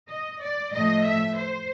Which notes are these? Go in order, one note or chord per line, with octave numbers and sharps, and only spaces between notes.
D#5
D5
A2 F3 A3 D#5
E5
C5